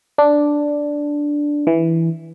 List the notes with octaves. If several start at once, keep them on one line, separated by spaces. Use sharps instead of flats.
D4
E3